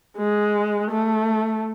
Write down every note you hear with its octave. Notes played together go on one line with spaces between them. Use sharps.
G#3
A3